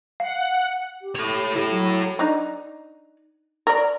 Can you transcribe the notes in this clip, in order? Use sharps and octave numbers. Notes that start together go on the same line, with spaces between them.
F5 F#5
G4
A4 C#5
E4 A4
F#3
D4 D#4
A#4 D5